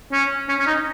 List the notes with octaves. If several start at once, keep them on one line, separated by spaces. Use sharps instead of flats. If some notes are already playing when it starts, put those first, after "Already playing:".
C#4
C#4
C#4
D#4